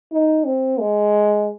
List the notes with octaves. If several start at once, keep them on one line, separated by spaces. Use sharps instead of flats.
D#4
C4
G#3